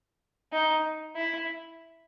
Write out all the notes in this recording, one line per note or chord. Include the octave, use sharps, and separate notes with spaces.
D#4
E4